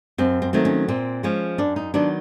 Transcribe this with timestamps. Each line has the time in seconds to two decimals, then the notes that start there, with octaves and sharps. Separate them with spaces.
0.18 F#2 C4
0.42 C4
0.53 D#3 F#3 A3 C4
0.65 C#4
0.88 A#2 C4
1.23 F3 G#3 C#4
1.58 F#2 D4
1.76 D#4
1.94 D#3 F#3 B3 D4